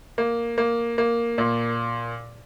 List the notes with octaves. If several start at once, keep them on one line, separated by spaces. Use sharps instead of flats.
A#3
A#3
A#3
A#2